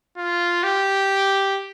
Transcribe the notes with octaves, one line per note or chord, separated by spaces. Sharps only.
F4
G4